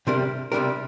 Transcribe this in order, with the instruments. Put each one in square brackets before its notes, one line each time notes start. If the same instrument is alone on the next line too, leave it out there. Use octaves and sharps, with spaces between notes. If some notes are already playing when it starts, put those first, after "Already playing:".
[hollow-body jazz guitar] C3 G3 D4 G4 A#4
C3 G3 D4 G4 A#4